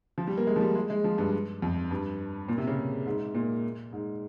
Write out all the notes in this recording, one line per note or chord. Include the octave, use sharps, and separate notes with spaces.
F3
G3
A#3
G#3
F3
G3
G#3
G#3
F3
G2
F2
G2
A#2
C3
C#3
G#2
A#2
G#2